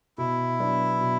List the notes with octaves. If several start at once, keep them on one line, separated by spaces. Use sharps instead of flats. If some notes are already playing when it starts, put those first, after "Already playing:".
B2 E4
F#3 B3 D4
B2